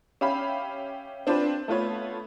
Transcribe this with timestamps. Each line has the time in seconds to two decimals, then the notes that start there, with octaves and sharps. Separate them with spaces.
0.21 C#4 G4 E5 F5 B5
1.27 C4 D4 F4 B4 C5
1.68 A3 B3 F4 B4 C#5